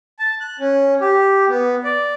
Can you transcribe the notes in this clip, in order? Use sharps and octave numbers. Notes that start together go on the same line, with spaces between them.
A5
F#6
C#4
G4
B3
D5